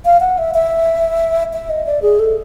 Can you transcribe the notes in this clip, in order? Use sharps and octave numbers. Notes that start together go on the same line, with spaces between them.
F5
F#5
E5
E5
E5
D#5
D5
G#4
A4